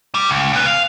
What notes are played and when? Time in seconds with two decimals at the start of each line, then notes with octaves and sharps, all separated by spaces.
0.15 G3
0.30 C#2
0.53 A#2 B3
0.66 F5